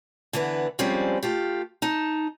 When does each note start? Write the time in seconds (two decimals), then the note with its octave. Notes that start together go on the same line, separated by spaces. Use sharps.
0.33 D3 E3 B3 B4
0.79 D3 F3 G3 G#3 C4 C#4
1.23 A3 F4 G4
1.82 D#4 A5